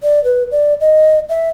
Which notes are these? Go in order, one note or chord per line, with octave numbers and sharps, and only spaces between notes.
D5
B4
D5
D#5
E5